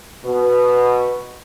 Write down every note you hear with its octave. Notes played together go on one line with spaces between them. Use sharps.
B2